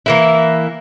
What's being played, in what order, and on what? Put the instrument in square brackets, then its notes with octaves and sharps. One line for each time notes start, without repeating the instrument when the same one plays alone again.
[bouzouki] E3 A#3 E4